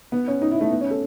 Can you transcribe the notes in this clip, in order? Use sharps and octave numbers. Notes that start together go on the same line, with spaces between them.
B3
C#4
D#4
E4
A3
B3
C#4
A4